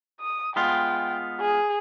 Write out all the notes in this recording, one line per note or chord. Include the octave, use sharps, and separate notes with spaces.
D#6
G#3 B3 F4 G5
G#4